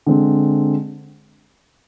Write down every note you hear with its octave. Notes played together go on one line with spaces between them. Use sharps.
D3 G#3 C4